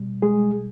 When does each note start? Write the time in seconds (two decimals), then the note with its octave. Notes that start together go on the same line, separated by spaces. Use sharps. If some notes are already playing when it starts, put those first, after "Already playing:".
Already playing: B2 G3
0.22 G#3 G#4